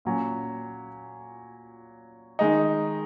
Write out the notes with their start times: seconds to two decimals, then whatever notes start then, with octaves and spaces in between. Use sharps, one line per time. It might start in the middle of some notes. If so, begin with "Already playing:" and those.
0.05 A#2 F#3 C#4
2.39 D#3 G#3 D#4